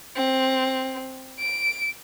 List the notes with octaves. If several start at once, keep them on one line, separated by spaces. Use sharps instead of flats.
C4
D7